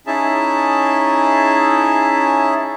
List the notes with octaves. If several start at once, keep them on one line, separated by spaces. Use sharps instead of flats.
C#4 D#4 E4 G#4 E5 A5